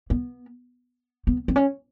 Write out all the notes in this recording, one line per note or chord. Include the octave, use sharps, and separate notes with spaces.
B3
B3
C4
C#4